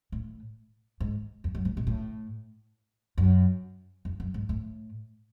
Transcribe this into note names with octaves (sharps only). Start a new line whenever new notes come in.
A2
G#2
F2
F#2
G#2
B2
A2
F#2
F2
F#2
G#2
A2